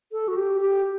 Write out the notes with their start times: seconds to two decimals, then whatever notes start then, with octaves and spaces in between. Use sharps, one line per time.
0.12 A4
0.28 F#4
0.36 G4
0.61 G4